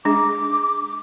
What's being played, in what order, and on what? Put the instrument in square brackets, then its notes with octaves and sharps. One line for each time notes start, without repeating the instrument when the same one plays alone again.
[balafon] G#3 D4 G#4 [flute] D6